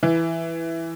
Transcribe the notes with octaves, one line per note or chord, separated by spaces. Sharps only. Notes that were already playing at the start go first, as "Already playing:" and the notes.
E3